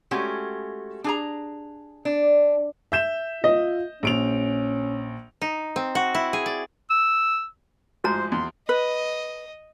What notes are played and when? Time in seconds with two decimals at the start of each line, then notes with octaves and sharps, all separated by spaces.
0.11 G#3 A3 C#4 F#4 G4
1.04 D4 G#4 A#5
2.05 D4
2.92 E5 G6 E7
3.44 F4 D#5
4.03 A#1 C#4 D7 F7
5.41 D#4
5.76 C4
5.95 F#4
6.15 E4
6.33 G#4
6.46 D5
6.90 E6
8.04 A1 G#2 F3 F#4 C5 A#5
8.32 E2 C6
8.69 B4 D#5